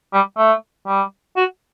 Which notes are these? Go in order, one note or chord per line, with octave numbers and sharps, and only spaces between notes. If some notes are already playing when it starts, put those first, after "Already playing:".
G3
A3
G3
F#4